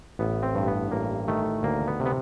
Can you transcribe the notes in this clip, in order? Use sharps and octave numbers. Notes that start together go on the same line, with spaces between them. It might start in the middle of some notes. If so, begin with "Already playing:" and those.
A1 B3
C4
G2
B3
A1 A#3
D#3 A3
D2 A#3
B3
C3
B3